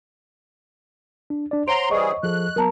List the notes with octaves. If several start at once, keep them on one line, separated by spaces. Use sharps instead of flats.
D4
D4 D5
C5 C#5 F#5 A#5 C6 D7
E3 G3 G#4 D#5 C#6
F3 G#4 A4 F#6
F#3 B3 A#4 A5 A#5